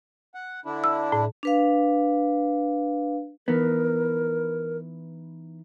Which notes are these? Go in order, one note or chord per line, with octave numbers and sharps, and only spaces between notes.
F#5
D3 D4 E4
E6
A2
D4 B4 F5
E3 B3 D#4 A#4